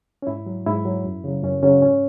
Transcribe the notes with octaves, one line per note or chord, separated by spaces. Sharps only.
C#4
G#2 E4
F#3
G#2 E4
F#3
F#2
C#3 F#3
F#2 C#4
C#3 F#3 C#4
G#2 C#4